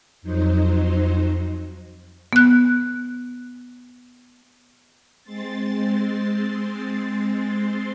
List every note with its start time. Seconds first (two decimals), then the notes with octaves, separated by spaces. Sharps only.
0.22 F2 F#3 D#4 C5
2.33 B3 F#6
5.23 G#3 C4 C6 A6